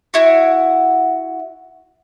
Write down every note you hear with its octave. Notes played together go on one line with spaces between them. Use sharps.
E4 F#4